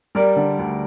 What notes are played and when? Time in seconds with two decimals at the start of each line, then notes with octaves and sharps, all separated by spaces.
0.15 G3 A#4 D5
0.36 D3
0.59 D2